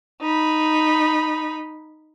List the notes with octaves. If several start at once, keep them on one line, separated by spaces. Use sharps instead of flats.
D#4 B5